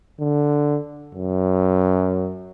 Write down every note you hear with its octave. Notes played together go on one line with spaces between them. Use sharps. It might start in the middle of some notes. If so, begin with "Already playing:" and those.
D3
F#2